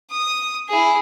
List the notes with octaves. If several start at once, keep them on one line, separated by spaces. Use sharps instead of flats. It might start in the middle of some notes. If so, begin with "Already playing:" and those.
D#6
E4 G#4